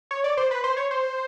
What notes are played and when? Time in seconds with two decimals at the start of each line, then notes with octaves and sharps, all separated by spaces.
0.11 C#5
0.24 D5
0.37 C5
0.51 B4
0.64 C5
0.77 C#5
0.91 C5